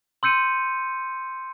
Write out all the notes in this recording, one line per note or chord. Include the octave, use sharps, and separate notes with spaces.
C6 E6 G6 C#7 D#7